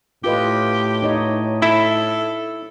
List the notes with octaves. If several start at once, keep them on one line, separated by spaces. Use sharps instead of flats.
A2 F4 G4 B4 D#5
D#4 C#5 D#5
E4 A4